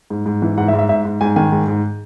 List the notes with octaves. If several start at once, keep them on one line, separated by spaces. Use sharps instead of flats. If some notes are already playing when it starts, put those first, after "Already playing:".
G#2
G#2
E3
G#2 F#5
E5
G#2
E5
G#2 E5
G#2
G#2 G#5
D#3 G#5
G#2
G#2